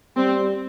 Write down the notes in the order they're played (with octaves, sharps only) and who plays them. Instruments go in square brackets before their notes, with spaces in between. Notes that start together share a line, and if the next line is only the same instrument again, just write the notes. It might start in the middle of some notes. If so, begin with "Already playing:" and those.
[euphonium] G3 [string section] C4